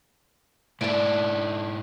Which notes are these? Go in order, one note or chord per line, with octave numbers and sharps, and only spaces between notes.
G#2 D4 E4 D5